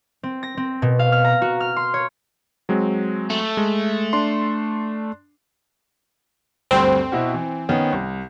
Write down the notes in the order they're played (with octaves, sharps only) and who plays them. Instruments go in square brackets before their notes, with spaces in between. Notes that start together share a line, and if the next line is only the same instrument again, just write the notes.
[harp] C4
A#6
C4
B2
F5
F6
A#5
F#4
F6
C6
C#5
[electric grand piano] F#3 G#3 C4
[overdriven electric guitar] A3
[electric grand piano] G#3
D4 C6
[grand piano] D2 G2 [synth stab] C4
[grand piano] B2 E4 F#4
E3
D#3 B3 C#4
C2